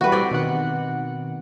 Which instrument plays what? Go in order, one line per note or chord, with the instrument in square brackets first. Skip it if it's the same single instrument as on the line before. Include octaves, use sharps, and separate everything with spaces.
[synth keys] E3 G3 [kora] F#4 B4
[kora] C4 D5
[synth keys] B2 D#3 F#5